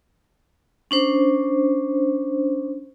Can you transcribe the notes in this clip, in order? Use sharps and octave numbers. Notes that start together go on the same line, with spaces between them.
C#4 D4 C5